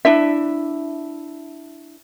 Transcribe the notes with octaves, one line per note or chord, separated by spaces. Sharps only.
D4 E4 E5